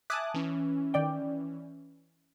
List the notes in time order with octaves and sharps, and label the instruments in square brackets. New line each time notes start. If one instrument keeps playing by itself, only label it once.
[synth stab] E5 G#5 A5 [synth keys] D6 D#6 F#6
[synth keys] E3 C#4
[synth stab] D#3 D5 G5